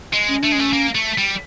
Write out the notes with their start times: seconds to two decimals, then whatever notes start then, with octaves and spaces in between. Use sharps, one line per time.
0.13 G#3
0.28 C#4
0.42 A3 D4
0.52 G#3
0.55 A3 C#4
0.73 A#3
0.95 A3
1.18 G3